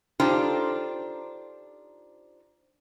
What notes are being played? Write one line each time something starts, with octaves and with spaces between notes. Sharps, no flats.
D4 D#4 F4 G4 A4 C5